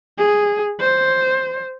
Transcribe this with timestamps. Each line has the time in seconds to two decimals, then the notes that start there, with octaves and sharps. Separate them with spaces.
0.18 G#4
0.80 C5